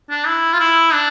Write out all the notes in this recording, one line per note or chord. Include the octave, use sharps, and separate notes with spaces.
D4
E4
F4
E4
D4